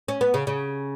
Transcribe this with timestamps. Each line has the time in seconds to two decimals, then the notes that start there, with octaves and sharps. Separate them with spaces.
0.08 C#4
0.21 B3
0.34 C#3
0.47 C#3